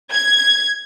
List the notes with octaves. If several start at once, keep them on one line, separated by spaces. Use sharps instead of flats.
G#6